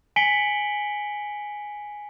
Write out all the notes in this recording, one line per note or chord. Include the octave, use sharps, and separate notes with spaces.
G#5 B6 C#7 D7 F#7 G7